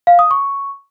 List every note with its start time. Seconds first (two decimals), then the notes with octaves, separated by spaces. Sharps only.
0.07 F5
0.19 D#6
0.31 C#6